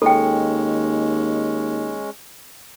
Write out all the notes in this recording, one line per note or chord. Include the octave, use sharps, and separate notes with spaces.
D#2 G#3 C#4 A4 G5